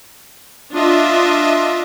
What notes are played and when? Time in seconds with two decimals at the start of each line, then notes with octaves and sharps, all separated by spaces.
0.73 D4 F4 D#5 E5